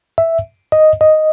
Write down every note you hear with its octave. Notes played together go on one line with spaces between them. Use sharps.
E5
D#5
D#5